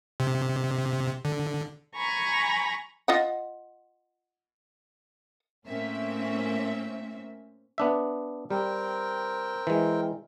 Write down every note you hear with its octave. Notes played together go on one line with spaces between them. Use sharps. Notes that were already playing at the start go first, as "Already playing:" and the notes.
C3
D3
G#5 A#5 B5 C#6
F4 D#5 F#5
A2 A#3 C4 C#4 E5
B3 D4 E5
G3 C4 A#4 G5
E3 G#3